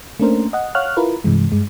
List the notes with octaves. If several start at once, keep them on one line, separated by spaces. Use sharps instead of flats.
A3 A#3 C#4 D4 A#4 C5
D#5 F#5
C#5 F5 F#5 F6 F#6
E4 F4 A#4 B4
G2 C3 E3 G#3
G2 G#3